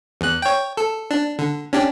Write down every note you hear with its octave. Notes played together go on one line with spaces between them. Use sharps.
E2 F#6
C#5 G5
A4
D4
D3
C#4 D4 G4